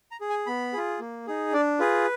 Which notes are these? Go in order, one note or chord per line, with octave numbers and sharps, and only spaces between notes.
A#5
G#4
G#5
B3 B5
F4 G#4
A#3
D#4 G#4
D4 D5
F4 G#4 B4